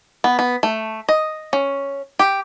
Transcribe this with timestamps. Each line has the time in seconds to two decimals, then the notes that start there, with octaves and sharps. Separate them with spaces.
0.24 B3
0.39 B3
0.63 A3
1.09 D#5
1.53 C#4
2.19 G4